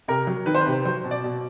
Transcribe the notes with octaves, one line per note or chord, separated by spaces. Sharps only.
C3 A#4
F#3
D#3 B4
C5
B4
C3
F#3 C5
B2
D5
B2